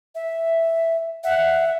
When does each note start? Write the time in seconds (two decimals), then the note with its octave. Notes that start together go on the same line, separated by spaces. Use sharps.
0.15 E5
1.24 E5 F#5